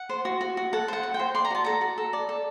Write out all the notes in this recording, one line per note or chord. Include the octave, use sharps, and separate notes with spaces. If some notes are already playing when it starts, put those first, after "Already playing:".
Already playing: F#5
C5
F#4
F#4
F#4
A4 F#5
C5 F#5
F#4
G5
C5
D5 C6
A#5
F#4 A5
A4 A#5
F#4
A4
D5
A4